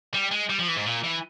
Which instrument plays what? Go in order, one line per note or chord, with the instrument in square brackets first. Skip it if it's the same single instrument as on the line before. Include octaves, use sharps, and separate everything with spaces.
[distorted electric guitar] G3
G#3
G3
F3
E3
G#2
A#2
E3